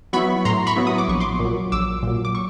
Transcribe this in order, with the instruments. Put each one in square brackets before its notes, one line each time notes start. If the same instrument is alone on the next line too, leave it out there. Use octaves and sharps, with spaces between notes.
[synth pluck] F#3 B3 E4 B5 C#6
A2 A#5 C6
B5 C#6
F#3 B3 E4
D#6
D6
A#1 C#6
C6 D6
A#2
F#3
A#1 D6 E6
A#2 F#3
D6
C#6